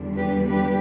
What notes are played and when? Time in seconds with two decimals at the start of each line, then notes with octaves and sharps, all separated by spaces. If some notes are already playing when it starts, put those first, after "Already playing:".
Already playing: E2 D3 G3 D4
0.16 G4 B4
0.46 G4 B4